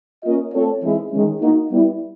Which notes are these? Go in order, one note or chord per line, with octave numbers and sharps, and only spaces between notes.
A#3 C#4 F4 A#4 D#5
A3 C4 F4 A4 C#5
E3 G#3 C4 E4
D#3 G#3 C#4
A#3 D#4 F#4
G3 B3 E4